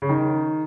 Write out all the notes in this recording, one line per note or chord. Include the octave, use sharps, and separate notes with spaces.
C#3
D#3